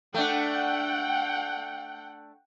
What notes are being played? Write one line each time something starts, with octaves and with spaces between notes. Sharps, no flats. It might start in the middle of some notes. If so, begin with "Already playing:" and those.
A3 D4 F#5 G5